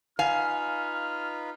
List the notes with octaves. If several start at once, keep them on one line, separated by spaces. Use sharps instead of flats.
D#4 F4 B4 F5 G#5 F6